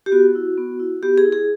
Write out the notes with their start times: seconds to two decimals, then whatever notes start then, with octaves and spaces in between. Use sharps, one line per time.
0.06 G4
0.12 B3 F#4
0.35 E4
0.58 B3
0.80 E4
1.03 B3 G4
1.18 G#4
1.25 E4
1.32 G#4